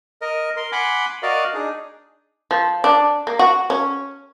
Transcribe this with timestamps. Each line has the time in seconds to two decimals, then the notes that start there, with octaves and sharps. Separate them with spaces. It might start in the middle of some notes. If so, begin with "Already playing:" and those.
0.21 A#4 D#5
0.57 A#4 C6
0.72 F#5 G#5 B5 C6 D6
1.23 F#4 A#4 D5 D#5 F5
1.54 D4 D#4 G#4
2.51 F3
2.84 D4
3.27 A#3
3.39 F#4
3.70 C#4